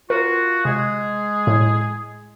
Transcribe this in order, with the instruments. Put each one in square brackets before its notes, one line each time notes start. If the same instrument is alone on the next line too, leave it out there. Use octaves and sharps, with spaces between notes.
[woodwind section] F4 F#4 [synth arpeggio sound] A#4
[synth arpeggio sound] C3 [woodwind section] G#3 G#4
[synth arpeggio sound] A2